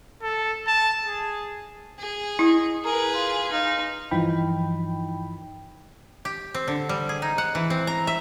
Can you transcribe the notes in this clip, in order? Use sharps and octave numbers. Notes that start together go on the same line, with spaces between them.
A4
A5
G#4
G#4
E4 D#5
G#4 A#4 B4
F4
D#4 F5
G2 E3 F3 D#4 G5 B5
G4
C4
D3
G3
G#4
D#4
F#5
E3
C4
A#5
E5